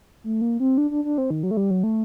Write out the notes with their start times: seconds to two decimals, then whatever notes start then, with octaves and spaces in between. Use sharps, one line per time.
0.24 A3
0.41 A#3
0.60 C4
0.78 D4
0.91 D4
1.05 D4
1.18 C4
1.30 D#3
1.43 F#3
1.51 A3
1.57 G3
1.71 F#3
1.84 A3